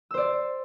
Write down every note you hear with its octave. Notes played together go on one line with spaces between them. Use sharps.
C5 D5 E6